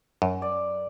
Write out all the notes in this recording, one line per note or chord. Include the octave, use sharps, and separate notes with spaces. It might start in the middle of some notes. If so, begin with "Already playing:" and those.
F#2
D5